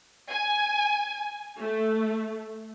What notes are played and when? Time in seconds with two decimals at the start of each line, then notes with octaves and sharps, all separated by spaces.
0.30 G#5
1.61 A3